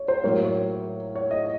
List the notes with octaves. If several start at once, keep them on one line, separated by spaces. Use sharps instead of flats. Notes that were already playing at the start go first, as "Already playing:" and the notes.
Already playing: C#5
C5
A2 F#3 A#3 C#5
C#5
C#5
D#5